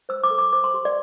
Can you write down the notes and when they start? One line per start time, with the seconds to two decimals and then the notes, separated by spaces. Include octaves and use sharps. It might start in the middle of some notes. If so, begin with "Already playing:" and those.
0.09 C5 E6
0.24 D6
0.31 A4
0.38 D6
0.53 C5 D6
0.64 C6
0.74 G4
0.85 D5